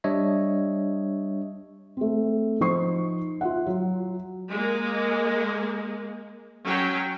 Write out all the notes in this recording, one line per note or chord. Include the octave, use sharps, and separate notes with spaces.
G3 D4 C#5 D#5 E5
A3 C4
F3 D#4 C5 C#6 C7
F4 E5 F#5
F#3 F4
G#3 A#3
F#3 C#4 G5